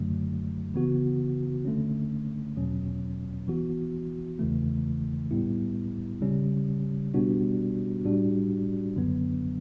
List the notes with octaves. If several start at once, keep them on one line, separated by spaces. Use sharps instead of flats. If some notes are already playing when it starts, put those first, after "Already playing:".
Already playing: F#2 D3 F#3 A3
C#3 E3 B3 F#4
D3 A3 C#4
E2 B2 F#3 C#4
E3 B3 F#4
E2 C#3 E3 A3
A2 G3 B3 E4
C#3 G3 C#4
B2 G3 B3 D4 F#4
A2 G3 D4 F#4
F#2 D3 F#3 B3